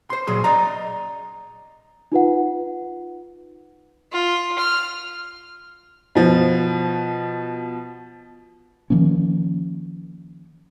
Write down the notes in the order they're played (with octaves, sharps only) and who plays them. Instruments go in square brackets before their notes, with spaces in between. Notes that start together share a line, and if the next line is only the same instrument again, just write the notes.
[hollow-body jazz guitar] C5 C6
A#2 F#3 G#4 C6
D5 D#5 A#5
[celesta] D#4 F4 B4 F#5
[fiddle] F4
F6
[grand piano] B2 F3
[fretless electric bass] D#3 F3 A#3 C#4